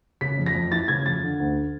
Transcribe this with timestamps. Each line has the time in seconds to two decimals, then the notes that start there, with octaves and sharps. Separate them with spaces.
0.21 C#3 B6
0.38 F2
0.46 A#6
0.55 F2
0.72 E3 A6
0.88 C#3 G#6
1.06 F2 A6
1.23 D3
1.40 D2